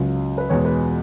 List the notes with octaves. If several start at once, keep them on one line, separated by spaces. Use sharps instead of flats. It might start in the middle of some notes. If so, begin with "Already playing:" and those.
Already playing: C#2 C#3 F#3
B4
E2 B2 G#3 C#5
B4